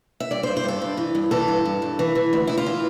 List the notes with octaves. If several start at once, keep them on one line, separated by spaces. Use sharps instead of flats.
E5
G2 D5
G2 C5
C5
G2 A4
G2
E3
G2
E3 A4
G2
G2
G2
E3
E3
D2
D2 E4
F4
E3